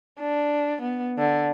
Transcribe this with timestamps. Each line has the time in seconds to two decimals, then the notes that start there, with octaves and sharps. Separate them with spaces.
0.20 D4
0.82 B3
1.18 D3